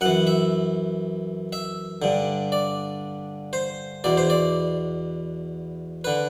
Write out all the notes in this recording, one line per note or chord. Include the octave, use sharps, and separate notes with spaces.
F#2 E3 F#5
E5
E5
G2 D3
D5
C5
E2 B2 D5
C5
D5
D3 B4